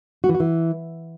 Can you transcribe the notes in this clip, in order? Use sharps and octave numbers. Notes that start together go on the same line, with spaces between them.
F#4
E3
F#4
E3